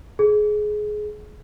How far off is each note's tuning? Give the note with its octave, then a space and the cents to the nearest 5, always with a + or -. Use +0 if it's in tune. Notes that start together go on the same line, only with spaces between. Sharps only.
G#4 +20